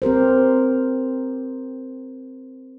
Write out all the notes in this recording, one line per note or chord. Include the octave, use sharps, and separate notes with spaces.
C4 G4 A#4 C5